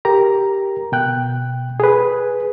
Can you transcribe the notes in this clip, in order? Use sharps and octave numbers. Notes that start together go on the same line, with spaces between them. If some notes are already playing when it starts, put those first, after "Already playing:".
G4 A#4 A#5
B2 G5 F#6
G#4 B4